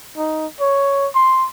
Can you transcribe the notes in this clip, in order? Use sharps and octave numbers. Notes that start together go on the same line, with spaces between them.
D#4
C#5
C6